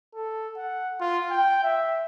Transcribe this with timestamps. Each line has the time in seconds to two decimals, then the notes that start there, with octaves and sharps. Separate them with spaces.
0.15 A4
0.57 F#5
1.00 F4
1.31 G5
1.63 E5